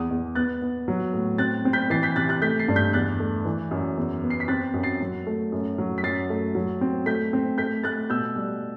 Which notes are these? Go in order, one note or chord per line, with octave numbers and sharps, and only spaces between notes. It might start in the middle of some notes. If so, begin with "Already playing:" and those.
Already playing: E2 D#6
E2
B3 F#6 A6
B3
F#3
A2
C4 F#6 A6
C4
G6 B6
E3 A6 C7
G6 B6
C3 F#6 A6
F#6 A6
A3 G6 B6
A6 C7
G2
G6 B6
E2 F#6 A6
A3
E3
F#2
E2
B3
C7
B6
C4 F#6 A6
F#2
A6 C7
F#3
A3
F#2
F#3
B6
F#2 A6 C7
A3
F#3
C4
A3 G6 B6
C4
A3 G6 B6
A3 F#6 A6
B2 E6 G6
G3